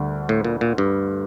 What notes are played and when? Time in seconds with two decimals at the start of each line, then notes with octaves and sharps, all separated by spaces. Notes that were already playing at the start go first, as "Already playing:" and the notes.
Already playing: D2 D3 G3
0.29 A2
0.44 A#2
0.61 A#2
0.78 G2